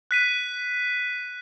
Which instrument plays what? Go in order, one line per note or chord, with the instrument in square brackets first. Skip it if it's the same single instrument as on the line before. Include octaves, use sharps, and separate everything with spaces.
[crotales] F#6 B6 D#7